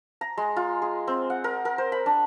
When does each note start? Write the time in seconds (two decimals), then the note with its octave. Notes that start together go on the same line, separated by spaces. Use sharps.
0.21 A#5
0.37 G#3
0.56 F4
0.82 G#4
1.07 C4
1.30 F#5
1.44 A#4
1.65 A#4
1.78 C5
1.92 B5
2.06 D4